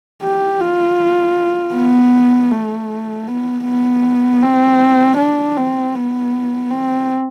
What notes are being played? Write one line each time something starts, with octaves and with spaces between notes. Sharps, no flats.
G4
F4
B3
A3
B3
B3
C4
D4
C4
B3
C4